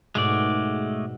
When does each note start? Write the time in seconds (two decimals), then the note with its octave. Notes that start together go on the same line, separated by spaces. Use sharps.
0.15 G#2 B2 G#3 A3 D5